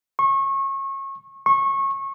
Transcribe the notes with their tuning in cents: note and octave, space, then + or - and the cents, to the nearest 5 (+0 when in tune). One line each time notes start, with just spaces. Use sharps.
C#6 -30
C#6 -25